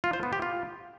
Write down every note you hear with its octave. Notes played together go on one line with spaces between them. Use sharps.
F4
C5
B3
G4
F4